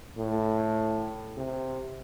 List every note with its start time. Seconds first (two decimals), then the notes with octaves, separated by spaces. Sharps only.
0.18 A2
1.37 C3